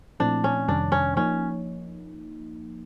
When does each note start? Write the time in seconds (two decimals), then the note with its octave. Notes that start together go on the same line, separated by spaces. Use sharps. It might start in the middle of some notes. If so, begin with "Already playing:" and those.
0.20 A#2 F3 A3 C4 D4 E4
0.44 C#4
0.68 F2 C3 D#3 G3 D4
0.92 C#4
1.16 F3 A#3 C#4 D#4